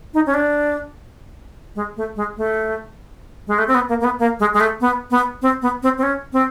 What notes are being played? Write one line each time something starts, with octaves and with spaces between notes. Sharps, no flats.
D#4
C#4
D4
G#3
A3
G#3
A3
G#3
A3
C4
B3
A#3
A#3
B3
A#3
G#3
G#3
A3
B3
B3
C4
B3
C4
C4
C#4
C4